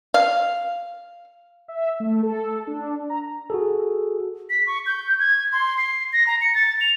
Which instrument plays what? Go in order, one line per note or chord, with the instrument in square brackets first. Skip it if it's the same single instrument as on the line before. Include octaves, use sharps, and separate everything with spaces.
[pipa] F5
[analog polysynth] E5
A3
A4
D4
A#5
[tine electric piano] F#4 G#4 A4
[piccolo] B6
C#6
G6
G#6
C6
C7
A#6
A#5
C#7
A6
F7